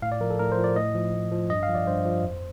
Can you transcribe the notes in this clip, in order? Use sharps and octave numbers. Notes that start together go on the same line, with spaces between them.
A2 F5
D5
F3 A#4
A4
A2 A#4
C5
F3
D5
A2 D#5
F3
A2
F3
G2 D#5
F5
F3
D5
G2 C5
F3
F2